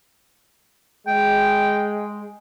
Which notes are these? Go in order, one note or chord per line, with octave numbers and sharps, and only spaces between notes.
G#3 G5